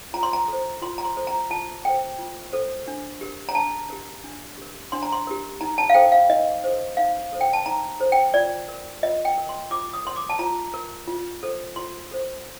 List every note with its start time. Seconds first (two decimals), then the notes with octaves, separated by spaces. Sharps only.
0.14 F4 A#5
0.23 C6
0.33 A#5
0.48 A4 C5
0.82 F4 C6
0.98 A#5
1.05 C6
1.17 A4 C5
1.27 A#5
1.50 F4 A5
1.85 A4 C5 G5
2.18 F4
2.53 A4 C5
2.87 D4
3.21 G4 A#4
3.49 A#5
3.55 D4 A5
3.90 G4 A#4
4.24 D4
4.58 G4 A#4
4.92 D4 C6
5.03 A#5
5.13 C6
5.27 G4 A#4
5.61 D#4 A#5
5.78 A5
5.90 F5
5.94 A4 C5 G5
6.12 F5
6.30 D#4 D#5
6.64 A4 C5
6.97 D#4 F5
7.32 A4 C5
7.41 G5
7.53 A5
7.66 D#4 A#5
8.00 A4 C5
8.12 G5
8.34 F4 D5
8.68 A#4
9.03 F4 D#5
9.25 G5
9.38 A#4
9.49 C6
9.71 F4 D6
9.93 D#6
10.05 A#4 C6
10.16 D6
10.30 A5
10.39 F4 A#5
10.74 A#4
11.07 F4
11.43 A4 C5
11.76 F4 C6
12.11 A4 C5